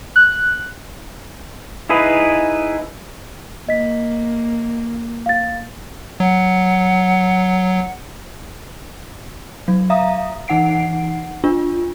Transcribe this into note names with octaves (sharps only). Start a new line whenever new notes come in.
F#6
D#4 E4 G#4 B4
A#3 D#5 B6
F5 A6
F#3 F#5
F#3
E5 F5 A#5 D#6
E3 D#4 F#5 C7 D7
D4 F4